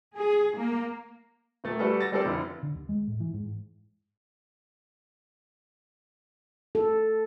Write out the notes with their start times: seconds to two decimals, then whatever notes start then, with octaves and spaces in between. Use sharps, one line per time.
0.16 G#4
0.56 A#3
1.64 D#1 A3 A6
1.79 G3 F#4 A4 B4
2.01 A6 A#6
2.12 G3 C4 A4 D5
2.25 F1 D3 E4
2.63 D3
2.75 D#2
2.89 G#3
3.08 A2
3.20 E3
3.34 G#2
6.75 A4